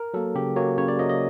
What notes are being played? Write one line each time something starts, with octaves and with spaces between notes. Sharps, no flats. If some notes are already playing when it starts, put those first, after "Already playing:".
Already playing: A#4
F#3 A#3 A4
C#3 G4
F#3 A#3 C#5
C#3 C#5
D5
F#3 A#3 D#5
D#5